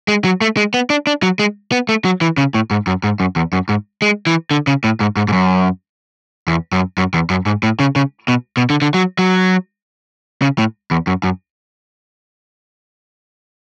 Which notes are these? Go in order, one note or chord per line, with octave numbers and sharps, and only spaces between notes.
G#3
F#3
A3
G#3
B3
D4
D4
F#3
G#3
B3
A3
F#3
E3
C#3
A2
G#2
F#2
G#2
F#2
E2
F#2
G#2
G#3
E3
D3
C#3
A2
G#2
G#2
G#2
F#2
E2
F#2
F#2
E2
F#2
G#2
A2
C#3
C#3
B2
B2
D3
D3
F#3
F#3
C#3
A2
E2
F#2
F#2